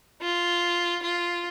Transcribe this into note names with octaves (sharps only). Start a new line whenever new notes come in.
F4
F4